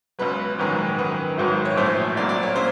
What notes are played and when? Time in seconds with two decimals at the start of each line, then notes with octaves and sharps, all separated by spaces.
0.19 C#2 B2 F#3 B4
0.59 A#1 G#2 D#3 F#3
0.98 F#2 D#3 F#3 B4
1.38 G#1 G#2 D#3 F#3
1.65 C#5
1.77 A#1 A2 F3 C5
2.17 C2 A#2 F#3 D5
2.29 D5
2.43 C#5
2.55 A#2 C5